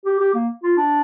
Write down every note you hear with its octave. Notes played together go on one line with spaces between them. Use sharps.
G4
G4
A#3
F4
D4